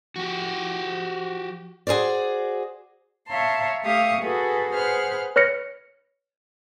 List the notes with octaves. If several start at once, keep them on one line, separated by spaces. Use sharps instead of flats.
F3 F#4 G4
F#4 G#4 A#4 C5 D5
C#5 E5 F5 A5 A#5 C6
A3 G4 E5 F5 C#6 D#6
F#4 G#4 A4 B4
G#4 B4 C5 F#5 F6
B4 C#5 F6 A#6 C#7